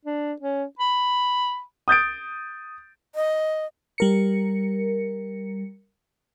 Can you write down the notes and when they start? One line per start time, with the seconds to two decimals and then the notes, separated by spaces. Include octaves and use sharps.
0.05 D4
0.42 C#4
0.79 B5
1.88 D#6 G6 A6 D7
3.15 D#5
3.98 G3 A#4 C#7